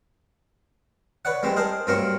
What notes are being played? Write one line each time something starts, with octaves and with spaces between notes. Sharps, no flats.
B4 C#5 D5 F#5
G3 G#3 C4 G4
G#4 A#4 C5 D#5 A5
G2 F#3 A#3 C4 A#4 C#6